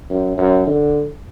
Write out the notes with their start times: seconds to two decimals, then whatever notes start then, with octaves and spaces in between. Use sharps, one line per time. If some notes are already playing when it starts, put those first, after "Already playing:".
0.10 F#2
0.37 F#2
0.67 D3